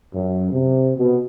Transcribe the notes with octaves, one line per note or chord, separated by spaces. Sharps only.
F#2
C3
B2